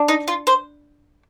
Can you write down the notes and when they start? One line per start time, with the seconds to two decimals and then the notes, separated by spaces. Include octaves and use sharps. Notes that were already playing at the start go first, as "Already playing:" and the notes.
Already playing: D4
0.08 D#4
0.28 F4
0.47 C5